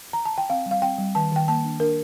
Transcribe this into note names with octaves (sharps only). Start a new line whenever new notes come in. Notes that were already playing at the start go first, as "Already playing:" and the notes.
A#5
A5
G5
C4 F5
G3
F5
C4 G5
G3
D#3 A5
D#3 G5
A#3 A5
D4
D4 A#4